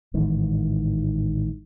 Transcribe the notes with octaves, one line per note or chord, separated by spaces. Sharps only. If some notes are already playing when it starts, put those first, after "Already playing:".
A1 G#2 D#3 E3